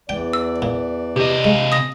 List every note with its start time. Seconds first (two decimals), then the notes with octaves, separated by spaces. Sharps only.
0.09 E2 E3 D5 G5
0.33 E6
0.62 A#2
1.16 C3 G4 D#5
1.44 G#3 F5 G#5
1.72 D#6 A#6